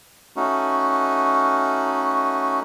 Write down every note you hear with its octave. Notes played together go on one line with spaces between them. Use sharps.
A3 C#4 D#4 F#4